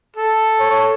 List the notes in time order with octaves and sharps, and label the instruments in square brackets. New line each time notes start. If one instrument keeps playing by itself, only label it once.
[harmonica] A4
[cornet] C#5